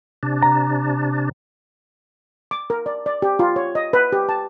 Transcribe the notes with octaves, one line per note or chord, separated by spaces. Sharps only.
C3 D4
A#5
D6
A#4
D5
D5
G4
F4
C#5
D#5
B4
G4
A5